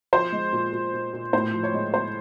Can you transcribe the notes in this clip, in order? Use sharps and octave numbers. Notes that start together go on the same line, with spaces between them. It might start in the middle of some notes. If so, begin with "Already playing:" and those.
F3 C5
G#3
A#2
A#2
A#2
A#2
A2 C5
F3
C#5
G#3
G#3 C5